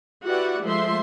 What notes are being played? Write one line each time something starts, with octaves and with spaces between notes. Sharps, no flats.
E4 F#4 G4 B4 D5 F#5
F3 G#3 A3 C5 E5 C6